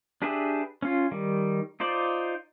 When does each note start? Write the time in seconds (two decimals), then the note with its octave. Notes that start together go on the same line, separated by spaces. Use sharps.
0.22 D4 G4 G#4 B4 E5
0.82 C#4 F4
1.11 D#3 G3
1.80 D#4 F4 C5 D5